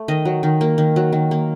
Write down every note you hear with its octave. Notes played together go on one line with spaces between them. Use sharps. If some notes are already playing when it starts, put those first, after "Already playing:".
Already playing: A3
D#3 D#5
F#3
D#3
A#3
D#3
F#3
D#3
A#3